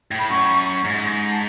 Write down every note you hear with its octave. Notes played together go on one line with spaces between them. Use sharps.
A2
B5
F#2 C#6
G#2
A5